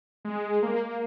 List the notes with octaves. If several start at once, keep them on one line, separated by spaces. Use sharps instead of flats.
G#3
A#3